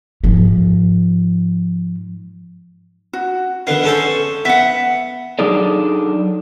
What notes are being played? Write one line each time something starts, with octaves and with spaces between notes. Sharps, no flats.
G#2 F3
F#4
D3 B3 F5
C#4 A4 C5
B3 E5 F#5
F#3 D4 D#4 G#4 A4 D5